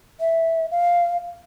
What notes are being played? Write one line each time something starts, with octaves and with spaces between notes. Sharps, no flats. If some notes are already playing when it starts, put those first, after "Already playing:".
E5
F5